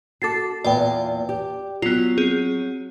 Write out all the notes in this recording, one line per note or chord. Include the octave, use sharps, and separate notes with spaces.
F#4 A4 D6 A6 C7
E2 A#2 B3 D5 G5
G4
F#3 B3 F4
C4 G#4